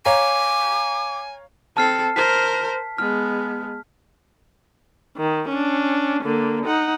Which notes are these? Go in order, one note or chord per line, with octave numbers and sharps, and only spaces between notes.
C#5 F5 G#5 A#5 D6
C4 A4 A5 F6 C7
A#4 C5 B6
G#3 B3 F6
D#3
C#4 D4
D3 A#3
D#4 F#5